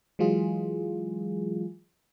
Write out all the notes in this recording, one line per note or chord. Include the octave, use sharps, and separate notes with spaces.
E3 F#3 G#3 F4 G#4